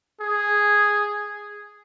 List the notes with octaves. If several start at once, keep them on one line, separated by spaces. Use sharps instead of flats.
G#4